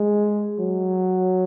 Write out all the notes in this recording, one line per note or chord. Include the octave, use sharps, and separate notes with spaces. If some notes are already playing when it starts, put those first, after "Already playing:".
Already playing: G#3
F#3